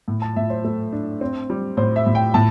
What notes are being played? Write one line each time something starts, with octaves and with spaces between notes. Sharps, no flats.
A2
A5
A2 E5
C5
A3
D4
C4
G3
A2 C5
E5
A2
G5
A2 A5